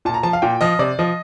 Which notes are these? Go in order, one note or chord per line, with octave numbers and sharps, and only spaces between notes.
A#2 A5
A#5
F3 A5
F5
A#2 G5
F3 D#5
C3 D5
F3 D#5